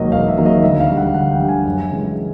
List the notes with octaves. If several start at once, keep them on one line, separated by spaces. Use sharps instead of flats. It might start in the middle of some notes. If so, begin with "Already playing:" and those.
Already playing: E1 D#2 D#3 F#3 A#3 D#5
E1 F5
E5
D#2 D#3 F#3 A#3
D#5
D2 E5
F5
D3 G3
F#5
D2 F#5
G5
D3 G3
G#5
F#2
C#3 E3 G#3